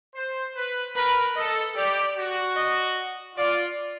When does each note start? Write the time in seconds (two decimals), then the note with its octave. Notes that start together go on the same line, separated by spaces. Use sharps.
0.16 C5
0.56 B4
0.96 A#4 B4
1.36 A4 D#5
1.76 G4 D5
2.17 F#4
2.56 D#5
3.36 F4 D5